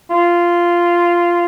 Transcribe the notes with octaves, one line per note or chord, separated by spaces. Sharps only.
F4